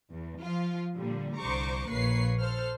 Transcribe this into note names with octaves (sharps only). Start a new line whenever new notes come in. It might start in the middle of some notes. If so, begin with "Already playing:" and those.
E2
F3 F4
A#2 D3 G3
C2 D3 C5 A#5 C#6 D6
A#1 A#3 B4 C#5 C7
A4 C5 F6